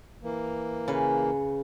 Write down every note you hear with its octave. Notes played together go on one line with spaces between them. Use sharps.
E3 A#3
C#3 B4